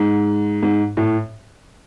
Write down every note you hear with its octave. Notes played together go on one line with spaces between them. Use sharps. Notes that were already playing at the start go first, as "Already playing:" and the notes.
Already playing: G#2
G#2
A2